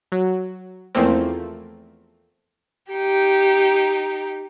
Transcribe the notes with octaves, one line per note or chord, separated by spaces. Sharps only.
F#3
E2 F3 A3 A#3 C4
D#4 G4